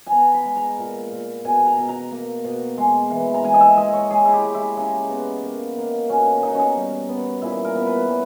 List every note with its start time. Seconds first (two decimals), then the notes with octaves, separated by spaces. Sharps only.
0.07 B3 G#5 A#5
0.34 B5
0.45 G#3
0.56 A#5
0.78 A#2
1.12 A#2
1.45 B2 G#5
1.66 A#5
1.78 B2
1.89 A#5
2.12 A#3
2.44 B2
2.78 G#3
3.10 E3
3.34 A#5
3.44 G#3 G#5
3.54 D#5
3.61 E5
3.77 G#3 D#5
3.93 C#5
4.10 G#3 G#4
4.25 E4
4.33 G4
4.44 G#3
4.55 E4
4.76 C#3 D#4
5.10 B3
5.43 A#3
5.76 A#3
6.09 B2 C#4
6.26 D#4
6.43 B2 D#4
6.55 C#4 D#4
6.76 G3
7.09 B3
7.42 A#2 E4
7.65 A#4
7.75 B3
7.87 B4
8.08 G3